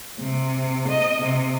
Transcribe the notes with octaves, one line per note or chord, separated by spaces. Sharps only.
C3
D#5
C3